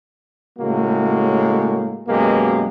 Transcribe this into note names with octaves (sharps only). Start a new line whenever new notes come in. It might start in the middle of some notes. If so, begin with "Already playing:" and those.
A2 C#3 G#3 A#3 F#4
F#2 B2 G#3 A#3 G4